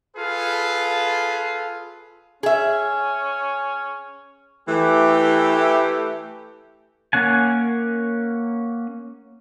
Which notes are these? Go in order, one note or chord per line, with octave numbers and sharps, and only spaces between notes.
F4 G#4 A4 B4 F5
C#4 G#4 E5
E3 A3 G4
A#3 C#4 F#5 G#5